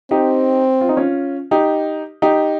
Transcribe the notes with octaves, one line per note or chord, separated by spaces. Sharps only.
C4 D#4 G4
F4
D#4
C#4 F4
D#4 G4
D#4 G4